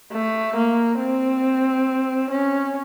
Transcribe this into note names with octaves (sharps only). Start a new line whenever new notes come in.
A3
A#3
C4
C#4